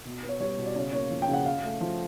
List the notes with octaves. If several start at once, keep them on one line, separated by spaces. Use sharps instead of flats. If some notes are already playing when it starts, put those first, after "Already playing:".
B2
B3
C#5
G3 C#5
B2
D5
C#3 C#5
A#3 C#5
F3
G5
C#3
F#5
C#4 F5
A3
F3